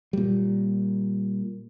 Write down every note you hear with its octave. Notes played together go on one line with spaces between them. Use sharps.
A#2 G3